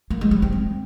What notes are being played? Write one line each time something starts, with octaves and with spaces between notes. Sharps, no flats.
A#3
G#3
G3
C4
C4